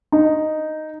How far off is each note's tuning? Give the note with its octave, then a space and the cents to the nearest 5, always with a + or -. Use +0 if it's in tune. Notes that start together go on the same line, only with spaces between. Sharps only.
D#4 -5